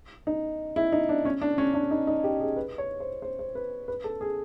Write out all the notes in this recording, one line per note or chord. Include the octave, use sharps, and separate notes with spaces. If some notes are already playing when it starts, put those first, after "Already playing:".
D#4
E4
D#4
D4
C#4
D4
C#4
D4
D#4
D#4
G4
G#4
B4
C#5
C5
C5
C5
B4
B4
A4
G#4